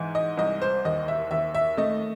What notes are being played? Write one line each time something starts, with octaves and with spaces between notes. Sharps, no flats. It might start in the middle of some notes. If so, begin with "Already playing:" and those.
Already playing: G#2 E3
D#5
C2 D#5
C5
D#2 D#5
E5
D#2 E5
E5
A3 D#5